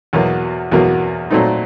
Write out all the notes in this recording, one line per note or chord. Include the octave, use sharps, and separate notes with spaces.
E2 B2 F#3 A#3
E2 B2 F#3 A#3
A#2 F#3 A3 C4 D#4